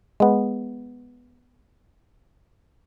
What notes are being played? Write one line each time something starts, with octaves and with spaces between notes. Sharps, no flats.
G#3 B3